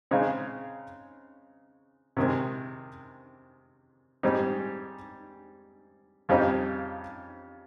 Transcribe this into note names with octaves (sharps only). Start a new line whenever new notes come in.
C#3 G#3 C4 D#4
C3 D#3 G#3 C4
G#2 G3 C4 D#4
F2 C#3 G3 C4 D#4